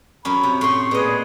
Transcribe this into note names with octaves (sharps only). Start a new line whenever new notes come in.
F#2 C#4 B5
C3
A2 C6 C#6
A#2 G#4 B4 D#5